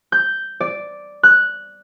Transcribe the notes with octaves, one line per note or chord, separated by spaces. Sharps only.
G6
D5
F#6